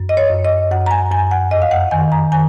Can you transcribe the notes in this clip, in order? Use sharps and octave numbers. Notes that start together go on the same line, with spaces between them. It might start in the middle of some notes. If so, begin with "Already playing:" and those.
Already playing: F#2
D#5
C#5
F#2
D#5
F#2 F#5
A#5
G#5
F#2 G#5
F#5
F2 D#5
F5
F#5
D#3 G#5
A#5
D#3 G#5